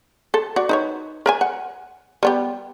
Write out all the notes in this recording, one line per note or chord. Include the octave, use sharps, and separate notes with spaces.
A4
F#4 D5
D#4 B4 C#5
A#4 E5 G#5
F#5
G3 B3 G4